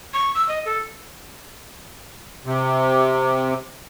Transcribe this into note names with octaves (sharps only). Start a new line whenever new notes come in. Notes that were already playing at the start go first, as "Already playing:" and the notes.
C#6
E6
D#5
A4
C3